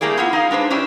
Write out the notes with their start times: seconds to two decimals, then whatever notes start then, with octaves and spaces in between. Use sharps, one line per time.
0.01 G3 A3 A#3 E4 G#4 D5
0.17 B3 E4 F4
0.33 D#4 G#4 F5
0.51 G#3 D4 B4 C5
0.70 C#4 D4 E4 G4